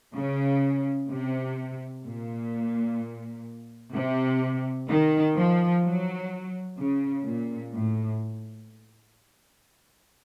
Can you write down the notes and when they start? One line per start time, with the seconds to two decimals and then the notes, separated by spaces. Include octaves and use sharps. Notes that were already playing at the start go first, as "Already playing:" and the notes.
0.16 C#3
1.10 C3
2.05 A#2
3.93 C3
4.89 D#3
5.36 F3
5.83 F#3
6.78 C#3
7.25 A#2
7.74 A2